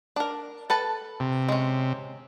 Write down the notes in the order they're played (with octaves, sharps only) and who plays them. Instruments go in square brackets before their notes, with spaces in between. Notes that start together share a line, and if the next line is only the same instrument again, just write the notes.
[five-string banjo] D4 A#4
A4 B4 A5
[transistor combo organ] C3
[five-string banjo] G#3 C#4